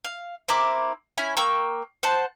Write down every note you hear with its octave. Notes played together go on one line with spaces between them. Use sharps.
F5
C4 E4 A#4 D6
C#4 E4 G#5
A#3 G5 C#6 E6
C5 F#5 A5